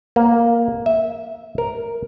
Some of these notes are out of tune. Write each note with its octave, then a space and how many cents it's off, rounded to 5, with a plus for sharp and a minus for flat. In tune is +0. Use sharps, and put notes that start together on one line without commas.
A#3 +5
E5 -15
A#4 +0